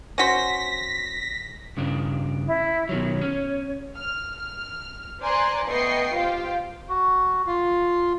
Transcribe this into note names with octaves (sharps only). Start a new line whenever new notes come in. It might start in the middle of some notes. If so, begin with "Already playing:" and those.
C#4 F#4 C5 A#6 B6
G2 C#3 D4
E4
B2 D#3 F#3 C#5
C#4
F6
F6
C5 D5 G#5 A#5 C6 F#6
A3 B3 D#5 G5 C#6 C7
F4 G4 C5 F5 G5
F#4
F4